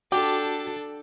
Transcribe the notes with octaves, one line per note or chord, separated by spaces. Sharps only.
D4 F#4 G4 A4